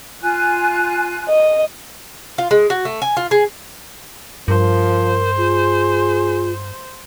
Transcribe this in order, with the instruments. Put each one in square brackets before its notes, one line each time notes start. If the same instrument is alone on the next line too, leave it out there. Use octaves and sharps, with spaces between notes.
[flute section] F4 G#5 F#6
[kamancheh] D#5
[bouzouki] F4
G#3
F#4
A3
G#5
F4
G#4
[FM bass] G2 [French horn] F3 [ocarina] A#4 [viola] C5
[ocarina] F4 [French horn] G#4